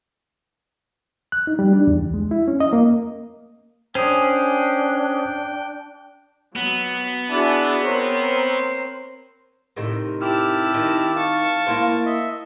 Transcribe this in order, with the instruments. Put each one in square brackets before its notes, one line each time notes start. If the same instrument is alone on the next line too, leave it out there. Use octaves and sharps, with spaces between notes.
[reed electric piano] F#6
D#4
G3
D4
E2
C#2
G#3
E4
C#4
D#5
A#3
[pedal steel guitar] C#4 G#4 [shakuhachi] D4 [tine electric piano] C5 D#6 [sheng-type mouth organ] G5
[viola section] F#3 [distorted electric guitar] B3
[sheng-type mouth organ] D4 A5 [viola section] E4 F#4 G#4
[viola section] C4 A#4 C#5 [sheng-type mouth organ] C5
[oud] A2 C3 D#3
[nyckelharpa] E4 A5 [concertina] G4 E6 F6
[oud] D#3
[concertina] F5 [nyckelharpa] A5 C#6
[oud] A#3 E4 C5
[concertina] D#5 E5